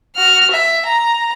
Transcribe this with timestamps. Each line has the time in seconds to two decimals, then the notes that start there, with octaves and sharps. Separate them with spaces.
0.16 F#4 F6
0.51 E5
0.86 A#5